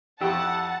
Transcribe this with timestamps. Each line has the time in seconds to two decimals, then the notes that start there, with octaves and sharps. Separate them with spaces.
0.21 F2 E4 G4 F#5 A5 C#6 E6